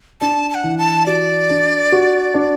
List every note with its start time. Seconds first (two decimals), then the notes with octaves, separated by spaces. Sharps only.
0.21 D4 A5
0.50 A5
0.55 F#5
0.64 E3
0.78 A5
1.06 F#4 D5
1.50 D4
1.92 F#4
2.34 D4